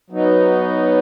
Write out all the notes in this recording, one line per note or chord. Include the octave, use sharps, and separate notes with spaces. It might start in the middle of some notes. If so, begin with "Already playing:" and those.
F#3 B3 D#4